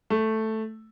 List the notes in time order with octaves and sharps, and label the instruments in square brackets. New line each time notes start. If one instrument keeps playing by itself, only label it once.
[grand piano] A3